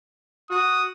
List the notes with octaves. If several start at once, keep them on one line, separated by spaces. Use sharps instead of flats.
F#4 D#6